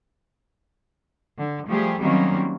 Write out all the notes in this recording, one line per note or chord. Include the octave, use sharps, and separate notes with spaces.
D3
F3 G3 A3 G4 G#4
D#3 F#3 G3 A#3 C4 C#4